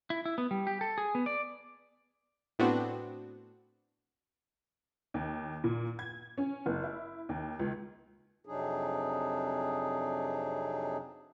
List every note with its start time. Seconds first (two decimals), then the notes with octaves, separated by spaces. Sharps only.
0.10 E4
0.25 E4
0.38 B3
0.51 G3
0.67 G4
0.81 A4
0.98 G#4
1.15 B3
1.26 D5
2.59 A2 B3 C4 D4 F#4
5.14 D#2
5.64 A#2
5.99 G#6
6.38 C#4
6.66 F#1
6.84 E4
7.29 D#2
7.59 C#2
8.45 F2 C3 F#3 D4 D#4 G#4